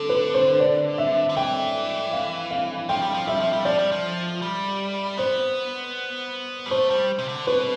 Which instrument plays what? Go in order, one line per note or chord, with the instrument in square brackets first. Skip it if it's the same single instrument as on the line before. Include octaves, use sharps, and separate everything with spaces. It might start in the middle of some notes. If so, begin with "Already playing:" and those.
Already playing: [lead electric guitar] D3 [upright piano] A4
[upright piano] B4
C5
D5
E5
[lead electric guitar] D3
[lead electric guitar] E3 [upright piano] G5
[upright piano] F5
F5
[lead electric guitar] F3 [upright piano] G5
[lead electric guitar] G3
F3
[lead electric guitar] G3 [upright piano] E5
[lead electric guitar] F3
G3
[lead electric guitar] F3 [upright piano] D5
[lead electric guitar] G3
F3
G3
[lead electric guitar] B3 [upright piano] C5
[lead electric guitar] G3
[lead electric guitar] A3 [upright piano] C5
[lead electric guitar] G3
C3
D3
[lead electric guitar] B2 [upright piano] B4